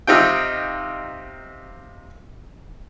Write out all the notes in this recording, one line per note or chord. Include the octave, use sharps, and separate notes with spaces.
C3 D#4 F4 G5